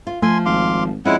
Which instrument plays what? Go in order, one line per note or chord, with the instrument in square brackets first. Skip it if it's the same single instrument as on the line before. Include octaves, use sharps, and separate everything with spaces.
[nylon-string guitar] F4
[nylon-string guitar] F3 [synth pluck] A3 [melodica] G#5 C6
[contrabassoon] G#1 [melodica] F5 C6 D6
[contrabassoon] F2 [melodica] G#3 E4 F#5 [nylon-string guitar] C#4